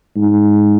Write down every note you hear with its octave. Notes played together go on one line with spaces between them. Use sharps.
G#2